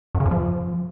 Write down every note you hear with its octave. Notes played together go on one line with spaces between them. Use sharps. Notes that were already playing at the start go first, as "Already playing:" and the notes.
F#2
C#3
F2
F3